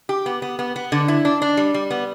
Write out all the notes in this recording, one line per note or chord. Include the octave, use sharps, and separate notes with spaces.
G4
B3
B3
B3
B3
D3
E4
D4
D4
G3
G3
B3